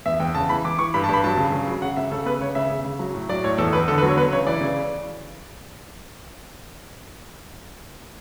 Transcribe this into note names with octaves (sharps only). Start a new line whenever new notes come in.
E2 E5
E2 G5
C#3 A5
E3 B5
E3 D6
E3 C#6
G2 B5
A5
G2 B5
F#3 A5
C#3
C#3
F#3
C#3 F#5
C#3 E5
C#3 A4
B3 B4
C#3 C#5
C#3 E5
C#3
C#3
F#3
A2
F#3 D5
A2 C#5
E2 A4
E2 B4
D3 A4
B4
F#3
C#5
B3 B4
C#3 C#5
E3 D5
C#3